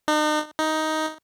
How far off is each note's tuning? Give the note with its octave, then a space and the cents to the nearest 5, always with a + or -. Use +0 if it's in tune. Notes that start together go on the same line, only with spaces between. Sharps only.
D#4 -40
D#4 +10